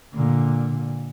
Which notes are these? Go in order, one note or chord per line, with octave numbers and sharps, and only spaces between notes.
A#2 D3